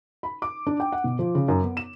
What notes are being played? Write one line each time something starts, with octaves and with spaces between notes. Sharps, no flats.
B5
D6
D4
G5
F#5
B2
F3
C#3
F#2
B3
E7